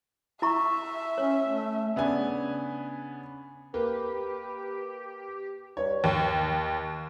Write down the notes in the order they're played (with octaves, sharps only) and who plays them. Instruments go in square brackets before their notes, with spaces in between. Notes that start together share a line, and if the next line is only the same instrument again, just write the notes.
[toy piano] E4 A#5 C#6 [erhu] E5
[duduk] C#4 [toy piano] C#5
[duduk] A3
[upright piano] C#3 B3 D4 G#5
[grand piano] A#3 [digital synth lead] G4 [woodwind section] B4
[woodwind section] G2 [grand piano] C#5
[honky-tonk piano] D#2